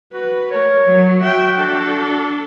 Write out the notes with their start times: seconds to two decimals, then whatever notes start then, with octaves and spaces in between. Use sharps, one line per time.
0.13 F#4 B4
0.51 A3 A#4 C#5
0.83 F#3
1.20 F#4 E5 G5
1.57 D4 A4